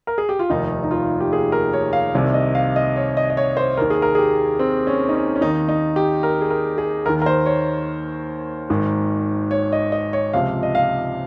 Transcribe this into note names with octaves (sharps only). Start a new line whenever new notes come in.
A#4
G#4
G4
F4
F1 D#2 D#3 D#4
D#4
F4
G4
G#4
A#4
C#5
F5
C2 C3 D#3
D#5
F5
D#5
C#5
D#5
D#5
C#5
C5
D#2 D#3 A#4
G#4
A#4
G#4
G4
C4
C#4
D#4
C#4
C#4
D#2 D#3 D#4
D#4
G4
A#4
G#4
A#4
G#4
D#2 D#3 A#4
A#4
C5
C#5
G#1 G#2 D#3
C#5
D#5
D#5
C#5
C#2 C3 F3 F5
D#5
F5